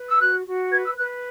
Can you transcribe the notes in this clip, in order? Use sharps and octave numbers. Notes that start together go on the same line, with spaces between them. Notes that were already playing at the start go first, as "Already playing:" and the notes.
Already playing: B4
E6
F#4 F#6
F#4
B4 G#6
E6
B4 F#6